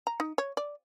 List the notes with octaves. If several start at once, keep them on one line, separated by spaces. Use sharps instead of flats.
A#5
D#4
C#5
D5